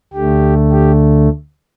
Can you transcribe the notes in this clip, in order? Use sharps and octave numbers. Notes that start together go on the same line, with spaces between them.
D2 D3 A3 G4
G4